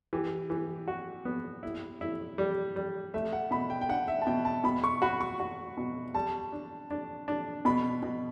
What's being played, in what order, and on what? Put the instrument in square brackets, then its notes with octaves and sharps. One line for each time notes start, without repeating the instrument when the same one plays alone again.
[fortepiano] E3 [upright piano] G4
[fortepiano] E3
F#4
B3
E4
E4
G3
G3
[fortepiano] A3 [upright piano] E5
[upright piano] F#5
[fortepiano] B2 [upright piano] B5
[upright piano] G5
G5
[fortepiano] D4 [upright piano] F#5
[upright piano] E5
A5
[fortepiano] B2 [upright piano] G5
[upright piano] A5
[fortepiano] B2 [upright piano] B5
[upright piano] C#6
[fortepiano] F#4 [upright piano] B5
[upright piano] C#6
[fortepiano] F#4
B2
[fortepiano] G3 [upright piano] A5
[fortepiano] D4
D4
D4
[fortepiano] B2 [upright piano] B5
[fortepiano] B2